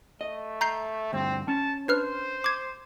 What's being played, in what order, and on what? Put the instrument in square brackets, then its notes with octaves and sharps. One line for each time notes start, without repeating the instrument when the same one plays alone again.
[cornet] A3 [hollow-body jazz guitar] D#5
[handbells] A#5 G6 C7
[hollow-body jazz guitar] D2 G2 [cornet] C4
[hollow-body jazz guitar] C#4 [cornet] A5
[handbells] D4 B4 F6 [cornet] C5
[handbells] D6 G#6